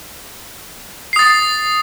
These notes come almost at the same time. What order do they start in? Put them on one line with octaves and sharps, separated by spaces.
C7 D#6 A6